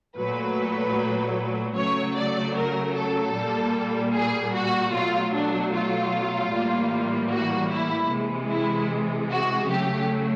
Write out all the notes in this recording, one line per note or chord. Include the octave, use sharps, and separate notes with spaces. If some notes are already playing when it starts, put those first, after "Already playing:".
A#2 F#3 A3 B4
C#3 F#3 A3 C#5
D5
A#4
A4
A#2 G3 A#3
G#4
F#4
B2 F#3 A3 F4
D4
F4
A2 E3 G3 A#3
F#4
E4
C3 E3 G#3
E4
F#4
C#3 F#3 A3 G4